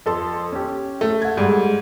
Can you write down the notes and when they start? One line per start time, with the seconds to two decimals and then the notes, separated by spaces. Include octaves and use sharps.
0.06 F2 A4 C6
0.52 C#4 G4
1.01 A3
1.22 F#5 G#6
1.37 G#2 G3